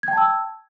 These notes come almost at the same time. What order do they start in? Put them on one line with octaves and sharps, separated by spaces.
G#6 G5 A5 E6